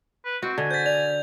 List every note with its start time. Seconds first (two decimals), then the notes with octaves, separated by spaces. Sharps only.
0.25 B4
0.42 C4 F#4
0.58 D3 G#5
0.71 C5 G6 A6 B6
0.86 D5 F7